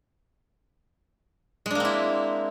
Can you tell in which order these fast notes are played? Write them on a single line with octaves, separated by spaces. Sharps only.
G#3 D4 A#3 C4 E4